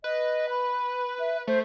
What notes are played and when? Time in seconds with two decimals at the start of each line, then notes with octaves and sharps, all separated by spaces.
0.04 B4 D#5
0.49 B5
1.19 E5
1.47 A3 C5